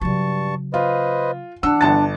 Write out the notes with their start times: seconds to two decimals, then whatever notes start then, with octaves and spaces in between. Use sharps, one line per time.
0.01 G2 C#3 F#3 A5 C#6
0.74 F4 B4 C5 D#5
1.63 E3 D4 F#5 E6
1.81 G1 A5 A6